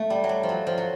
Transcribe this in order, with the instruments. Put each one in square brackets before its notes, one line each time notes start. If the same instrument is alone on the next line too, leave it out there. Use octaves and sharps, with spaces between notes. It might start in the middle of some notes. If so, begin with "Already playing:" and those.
Already playing: [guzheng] A3
G3
F#3
G3
F3
F#3
F3
F#3